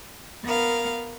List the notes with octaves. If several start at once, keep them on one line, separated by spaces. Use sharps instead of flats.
B3 A#4 F5